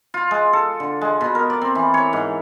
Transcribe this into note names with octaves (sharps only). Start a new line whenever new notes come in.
F4
G#3
A4
D3
G#3
B2
A#4
D5
C4
E3
C#5
G#2